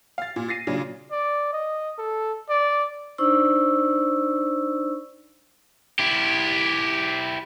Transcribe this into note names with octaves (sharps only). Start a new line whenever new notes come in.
F5 A6
A#2
A6 A#6 C7 D#7
A#2 C#3 F#3 D4
D5
D#5
A4
D5
D4 D#4 C5 D5 C#6 E6
E4 G4